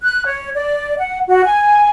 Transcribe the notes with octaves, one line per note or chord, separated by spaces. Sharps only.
F#6
C#5
D5
F#5
F#4
G#5